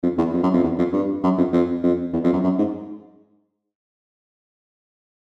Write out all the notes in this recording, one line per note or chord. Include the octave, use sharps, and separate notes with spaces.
F2
E2
F2
F#2
F2
E2
F2
G2
F#2
F2
F2
F2
E2
F2
F#2
F#2
G#2